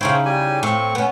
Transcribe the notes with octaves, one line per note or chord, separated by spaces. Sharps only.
C#3 D#4 E4 C5 C#5 G5
G3 G4 G#5
A2 C4 C#6
B3 C#4